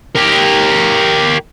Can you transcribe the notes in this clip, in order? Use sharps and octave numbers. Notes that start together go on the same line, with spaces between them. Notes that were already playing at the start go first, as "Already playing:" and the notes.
G4 A#4